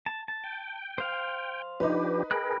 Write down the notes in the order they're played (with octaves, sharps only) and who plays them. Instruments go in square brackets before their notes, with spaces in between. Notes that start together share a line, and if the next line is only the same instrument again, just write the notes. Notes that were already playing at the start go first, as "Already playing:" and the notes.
[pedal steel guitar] A5
A5
[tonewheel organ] G5
[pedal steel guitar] C5 F5
[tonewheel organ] F3 D4 G4 [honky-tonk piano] D#4 B4
[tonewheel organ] G#4 A#4 [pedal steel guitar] G5 B5 F#6